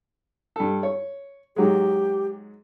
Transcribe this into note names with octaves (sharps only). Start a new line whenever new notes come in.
G2 A4
C#5
G#2 F#3 G#3 G4